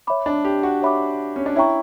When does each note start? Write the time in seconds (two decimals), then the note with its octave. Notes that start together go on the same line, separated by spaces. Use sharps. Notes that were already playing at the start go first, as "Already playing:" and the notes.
0.07 C#5 E5 B5 D6
0.26 D4
0.45 G4
0.63 F#4
0.82 C#5 E5 B5 D6
1.36 C#4
1.46 D4
1.56 E4 C#5 E5 G5 A#5 C#6